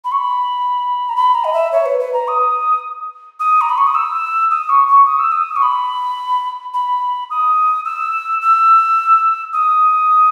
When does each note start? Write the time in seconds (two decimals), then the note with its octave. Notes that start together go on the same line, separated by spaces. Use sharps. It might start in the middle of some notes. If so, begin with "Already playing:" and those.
0.04 B5
0.12 C#6
0.18 B5
1.09 A#5
1.16 B5
1.35 A#5
1.45 D#5
1.53 E5
1.72 C#5
1.86 B4
2.00 B4
2.14 A#5
2.28 D#6
3.40 D#6
3.61 A#5
3.69 B5
3.78 C#6
3.87 D#6
3.95 E6
4.51 D#6
4.69 C#6
4.88 C#6
5.07 D#6
5.19 E6
5.32 D#6
5.56 C#6
5.62 B5
6.74 B5
7.30 D#6
7.85 E6
8.42 E6
9.53 D#6